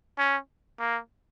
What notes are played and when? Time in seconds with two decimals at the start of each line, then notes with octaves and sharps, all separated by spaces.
0.18 C#4
0.80 A#3